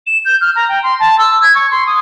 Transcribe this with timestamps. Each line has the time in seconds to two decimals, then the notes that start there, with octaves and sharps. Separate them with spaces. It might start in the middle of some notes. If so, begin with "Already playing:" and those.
0.06 E7
0.25 G6
0.41 F6
0.55 A#5
0.69 G5
0.83 C6
0.99 A5
1.18 E6
1.42 G#6
1.55 C#6
1.70 C6
1.86 D#6